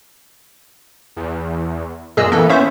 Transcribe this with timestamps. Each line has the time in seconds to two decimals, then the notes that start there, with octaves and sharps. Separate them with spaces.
1.16 E2
2.17 F#2 A#2 G#4 D#5 E6
2.32 E3 A#3 B3 A4
2.49 C#4 C5 E5